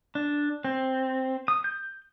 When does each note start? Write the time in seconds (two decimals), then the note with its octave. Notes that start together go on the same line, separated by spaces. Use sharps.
0.15 D4
0.64 C4
1.48 D#6
1.64 G6